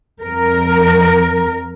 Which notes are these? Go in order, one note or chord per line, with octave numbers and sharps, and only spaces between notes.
F2 A#4